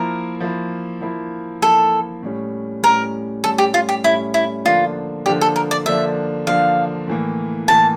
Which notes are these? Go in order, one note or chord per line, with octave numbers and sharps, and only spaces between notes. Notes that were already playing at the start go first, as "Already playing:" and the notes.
Already playing: F3 A#3 E4 A#4
F3 A#3 E4
F3 A#3 E4
F3 A#3 E4 A4
A2 G3 C#4
A2 G3 C#4 A#4
A2 G3 C#4 A4
G4
F4
G4
A2 G3 C#4 E4
E4
D3 F3 A#3 D4 F4
D3 F3 A#3 D4 G4
A4
A#4
D5
D3 F3 A#3 D4 E5
D3 F3 A#3 D4 F5
A2 E3 A#3
A2 E3 A#3 A5